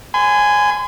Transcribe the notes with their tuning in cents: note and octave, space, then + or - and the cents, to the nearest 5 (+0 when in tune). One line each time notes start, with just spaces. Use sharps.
G#5 +0 C6 -45